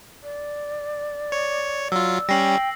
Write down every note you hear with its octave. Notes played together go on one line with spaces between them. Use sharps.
D5
C#5
F#3 F4 E6
G3 C#4 G5 A#6 C7 F#7